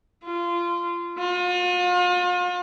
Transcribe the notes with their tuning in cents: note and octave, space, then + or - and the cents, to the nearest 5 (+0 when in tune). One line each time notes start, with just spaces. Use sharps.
F4 -20
F4 +40